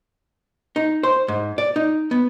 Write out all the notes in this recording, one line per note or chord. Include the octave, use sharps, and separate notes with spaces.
D#4
C5
G#2
D5
D#4
B3